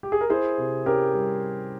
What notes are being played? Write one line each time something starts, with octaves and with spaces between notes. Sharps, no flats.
G4
G#4
A#4
E4 G#4 C5
C3
C#4 G4 A#4
G3